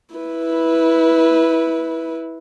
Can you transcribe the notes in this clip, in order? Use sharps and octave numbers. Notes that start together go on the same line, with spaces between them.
E4 B4